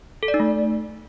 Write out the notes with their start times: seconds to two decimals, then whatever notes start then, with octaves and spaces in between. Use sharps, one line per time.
0.23 A4
0.28 D5
0.34 D#4
0.40 A3